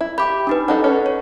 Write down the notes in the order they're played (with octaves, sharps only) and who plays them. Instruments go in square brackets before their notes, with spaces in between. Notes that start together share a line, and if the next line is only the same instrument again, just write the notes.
[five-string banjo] E4
[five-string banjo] G4 [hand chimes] B5 D6
[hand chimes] D4 D#4 B4
[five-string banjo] D4 D#4 A4 [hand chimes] F#5
[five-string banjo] C#4 A4
[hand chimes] C#5